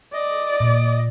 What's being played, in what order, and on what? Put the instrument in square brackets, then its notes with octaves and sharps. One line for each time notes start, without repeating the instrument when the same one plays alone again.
[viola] D5 [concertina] D#5
[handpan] A#2